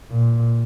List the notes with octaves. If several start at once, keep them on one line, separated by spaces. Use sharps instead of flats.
A#2